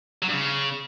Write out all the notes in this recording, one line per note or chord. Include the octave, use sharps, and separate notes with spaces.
F#3
G2
C#3